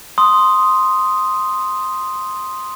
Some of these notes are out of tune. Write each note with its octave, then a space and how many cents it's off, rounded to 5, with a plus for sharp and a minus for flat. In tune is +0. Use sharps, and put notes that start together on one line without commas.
C6 +0 D#6 +0